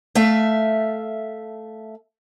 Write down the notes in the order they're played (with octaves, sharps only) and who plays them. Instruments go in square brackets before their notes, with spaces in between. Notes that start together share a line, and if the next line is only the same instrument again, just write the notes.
[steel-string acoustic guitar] A3 E5 F5